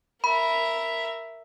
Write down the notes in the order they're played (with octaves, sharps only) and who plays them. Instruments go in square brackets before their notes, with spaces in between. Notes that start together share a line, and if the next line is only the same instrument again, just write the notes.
[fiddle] A#4 E5 [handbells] B5